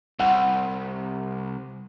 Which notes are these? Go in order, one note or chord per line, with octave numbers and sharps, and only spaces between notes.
C2 F#5